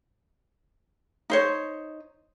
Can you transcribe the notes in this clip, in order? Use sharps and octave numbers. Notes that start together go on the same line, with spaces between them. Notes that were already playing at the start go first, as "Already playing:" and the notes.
D#4 C5 C#5